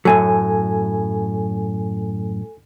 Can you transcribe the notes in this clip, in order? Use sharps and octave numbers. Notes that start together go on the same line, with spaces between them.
F#2 A2 F#3 A4 G#5